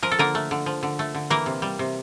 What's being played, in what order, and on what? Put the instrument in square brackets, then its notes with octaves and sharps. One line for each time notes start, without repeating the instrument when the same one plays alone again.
[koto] F3 A#4
A4
D3 A#3 A#4
A3
D3
F3
D3
A3
D3
E3 A#3 A#4
C3
G3
C3